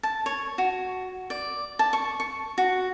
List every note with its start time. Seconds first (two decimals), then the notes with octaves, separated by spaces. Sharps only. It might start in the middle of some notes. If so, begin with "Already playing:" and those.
0.03 A5
0.26 C#5
0.58 F#4
1.30 D5
1.79 A5
1.93 C#6
2.20 C#6
2.58 F#4